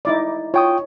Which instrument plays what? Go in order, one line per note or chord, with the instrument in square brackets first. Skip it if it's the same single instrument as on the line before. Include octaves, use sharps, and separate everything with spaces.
[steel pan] D#4 E4 D5
[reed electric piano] F4 G5 D#6 [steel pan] C#5